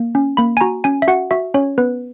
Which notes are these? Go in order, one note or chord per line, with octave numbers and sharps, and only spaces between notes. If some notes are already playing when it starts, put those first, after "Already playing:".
Already playing: A#3
C#4
A#3 B5
G#5
F#4 A#5
C#4 G#5
E5
F#4 F#5
F#4 E5
C#4 C#5
B3 B4